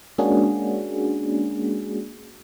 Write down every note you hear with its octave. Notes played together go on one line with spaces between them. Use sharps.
G#3 A#3 C#4 D4 F#4 G#4